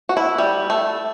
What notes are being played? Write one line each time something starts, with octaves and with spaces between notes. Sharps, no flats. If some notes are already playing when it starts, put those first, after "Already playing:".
F#4
E4
G3
A3